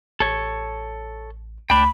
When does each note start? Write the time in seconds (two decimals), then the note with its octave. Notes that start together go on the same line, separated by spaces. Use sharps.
0.20 A1 A4 C#5
1.70 C#2 A3 D4 G5 B5